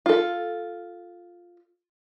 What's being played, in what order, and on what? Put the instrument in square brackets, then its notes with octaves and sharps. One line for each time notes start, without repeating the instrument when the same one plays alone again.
[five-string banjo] F4 A4